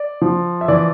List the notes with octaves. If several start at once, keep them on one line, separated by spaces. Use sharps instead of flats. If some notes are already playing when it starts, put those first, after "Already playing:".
Already playing: D5
F3
E5
E3 D5